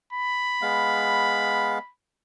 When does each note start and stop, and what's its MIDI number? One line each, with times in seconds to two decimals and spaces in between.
0.13 1.91 83
0.62 1.79 56
0.62 1.79 59
0.62 1.79 77